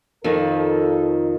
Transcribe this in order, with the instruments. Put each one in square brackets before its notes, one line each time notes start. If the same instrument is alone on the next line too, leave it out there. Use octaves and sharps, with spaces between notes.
[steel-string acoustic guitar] F2 D#3 F3 [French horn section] A4 A#4